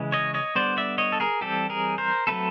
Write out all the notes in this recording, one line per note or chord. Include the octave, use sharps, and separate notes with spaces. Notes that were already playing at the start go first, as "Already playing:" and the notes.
Already playing: C#3 E3 G#3
C#5 D#5
C#5 D#5
D3 G3 B3 C5 D5
D5 E5
C#5 D#5
A4
G#4 A#4
E3 G3 C4 G4 A4
G#4 A#4
A#4 C5
F#3 A3 C4 A4 B4